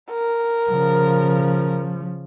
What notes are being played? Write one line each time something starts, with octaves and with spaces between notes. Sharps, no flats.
A#4
C#3 F3